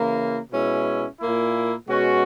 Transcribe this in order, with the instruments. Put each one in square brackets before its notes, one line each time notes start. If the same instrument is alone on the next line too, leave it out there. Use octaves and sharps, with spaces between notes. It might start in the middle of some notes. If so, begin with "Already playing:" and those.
Already playing: [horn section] C#3 E3 A#3 E4
B2 G#3 C#4 E4
A#2 A#3 E4
B2 G#3 C#4 F#4